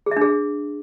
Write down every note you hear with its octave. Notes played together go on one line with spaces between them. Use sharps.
G#4
E5
D4
G#4